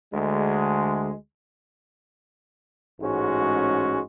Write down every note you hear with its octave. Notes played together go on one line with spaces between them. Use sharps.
D2 D3 G#3
A1 G#2 G#3 C#4 F#4